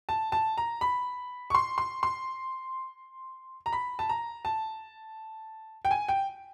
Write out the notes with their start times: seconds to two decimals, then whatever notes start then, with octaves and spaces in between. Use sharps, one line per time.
0.09 A5
0.32 A5
0.58 A#5
0.81 B5
1.50 C#6
1.55 C6
1.78 C6
2.03 C6
3.66 A#5
3.73 B5
3.99 A5
4.09 A#5
4.45 A5
5.85 G5
5.91 G#5
6.08 G5